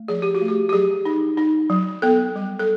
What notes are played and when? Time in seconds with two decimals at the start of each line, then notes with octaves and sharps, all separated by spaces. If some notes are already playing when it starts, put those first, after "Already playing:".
Already playing: A3
0.08 F3 G#4
0.22 G4
0.35 F#4
0.41 A3
0.48 G4
0.69 G4
0.73 F#3 G#4
1.05 D#4
1.37 D#4
1.70 F#3
2.02 B3 A4
2.36 G3
2.59 A4